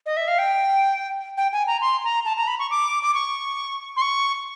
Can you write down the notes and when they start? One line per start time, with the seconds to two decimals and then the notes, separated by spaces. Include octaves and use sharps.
0.06 D#5
0.17 E5
0.28 F5
0.39 G5
1.37 G5
1.53 G#5
1.67 A#5
1.81 C6
2.04 A#5
2.25 A5
2.37 A#5
2.47 B5
2.59 C#6
2.71 D6
3.03 D6
3.14 C#6
3.97 C6
4.02 C#6